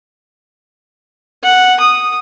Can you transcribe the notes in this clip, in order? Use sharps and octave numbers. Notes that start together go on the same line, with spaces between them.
F#5
D#6